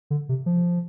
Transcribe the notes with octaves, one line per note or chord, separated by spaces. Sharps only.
D3
C3
F3